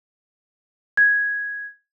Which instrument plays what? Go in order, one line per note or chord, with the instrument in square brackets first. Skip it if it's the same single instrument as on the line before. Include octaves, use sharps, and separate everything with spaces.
[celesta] G#6